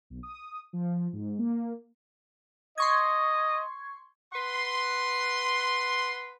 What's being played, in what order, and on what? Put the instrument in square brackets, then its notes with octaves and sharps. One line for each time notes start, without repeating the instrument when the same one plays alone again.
[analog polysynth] B1
D#6
F3
G#2
A#3
[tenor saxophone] D#5 [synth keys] C6 C#6 G#6
[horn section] B4 F#5 C6